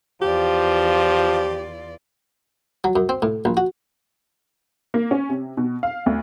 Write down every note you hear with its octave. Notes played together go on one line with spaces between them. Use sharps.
E2 F3 F4 G4 D5
F#3
F#2
C4
A2
A#1
F#4
A#3
C#4
C3
B2
F5
D2